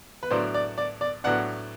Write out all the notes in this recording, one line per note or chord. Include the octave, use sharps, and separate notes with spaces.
B4
A2 F#3 B3 D4 C5
D5
D5
D5
A2 F#3 B3 D4 F#5